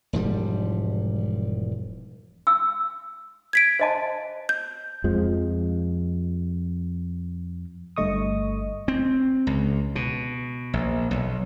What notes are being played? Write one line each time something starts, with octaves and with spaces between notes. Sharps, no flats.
E1 G#2 F3 G3
E6
G#6 B6 D7
C5 D#5 A5
G6
F2 F3 G#3
G1 G2 A3 D#5 C#6 D#6
C4
C#2
B2
A#1
B1